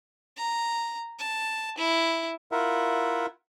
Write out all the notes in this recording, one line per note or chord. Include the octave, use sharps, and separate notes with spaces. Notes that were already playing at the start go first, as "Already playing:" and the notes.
A#5
A5
E4
E4 F4 A#4 E5 F#5